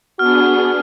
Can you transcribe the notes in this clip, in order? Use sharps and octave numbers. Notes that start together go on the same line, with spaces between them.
B3 D4 F#4 G#4 F6